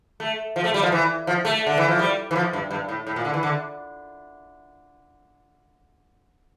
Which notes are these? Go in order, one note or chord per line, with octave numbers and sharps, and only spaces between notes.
A3
F3
A3
G3
F3
E3
F3
A3
D3
E3
F3
G3
E3
F3
G2
G2
A2
A2
A#2
D3
E3
D3